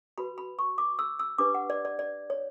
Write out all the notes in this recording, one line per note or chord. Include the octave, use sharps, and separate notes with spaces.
F#4 B4 B5
B5
C#6
D6
E6
E6
D4 G4 B4 D6
F#5
D5
D5
D5
C#5